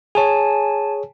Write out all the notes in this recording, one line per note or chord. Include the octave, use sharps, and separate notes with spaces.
G#4 C#5 G#5 A5